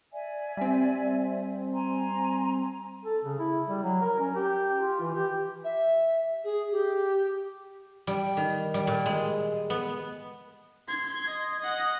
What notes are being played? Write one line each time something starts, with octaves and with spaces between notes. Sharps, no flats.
D5 E5 G#5
G3 C4
G#5 A#5 C6
A4
C#3
E4
G3
F#3
A#4
C#4
G4
F4
E3
G4
E5
G#4
G4
G3
D#3
G3
A#2
G#3
B3
C6 G#6
D#5
D#5 F#5